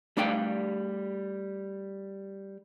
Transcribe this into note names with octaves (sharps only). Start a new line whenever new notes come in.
G3 A3 D4 G4 F5 G5